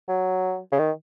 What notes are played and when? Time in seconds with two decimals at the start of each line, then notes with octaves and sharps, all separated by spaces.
0.09 F#3
0.72 C#3
0.79 D#3